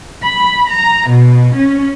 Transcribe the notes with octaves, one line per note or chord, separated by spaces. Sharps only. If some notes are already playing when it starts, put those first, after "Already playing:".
B5
A#5
B2
C#4